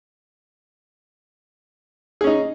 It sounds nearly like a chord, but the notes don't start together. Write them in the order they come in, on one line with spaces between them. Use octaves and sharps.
G#4 C#4 D#4